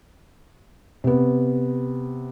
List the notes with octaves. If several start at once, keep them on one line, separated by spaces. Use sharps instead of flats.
C3 B3